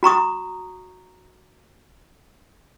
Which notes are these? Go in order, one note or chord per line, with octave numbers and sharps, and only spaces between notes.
F#4 A#5 C#6 D#6